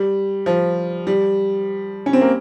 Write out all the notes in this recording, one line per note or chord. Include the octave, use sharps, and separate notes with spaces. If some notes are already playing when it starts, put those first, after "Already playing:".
Already playing: G3
F3
G3
C#4
C4
A#3